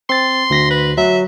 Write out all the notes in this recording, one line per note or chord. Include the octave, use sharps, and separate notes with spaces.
C4 C6 A6
D2 A#6 B6
B4
F#3 E5